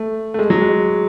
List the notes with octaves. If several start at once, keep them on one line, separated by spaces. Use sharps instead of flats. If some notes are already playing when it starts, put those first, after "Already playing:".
Already playing: A3
A3
G#3
F#3
G#3